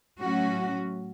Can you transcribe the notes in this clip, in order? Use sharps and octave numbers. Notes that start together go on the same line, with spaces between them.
A2 F#3 C#4 F#4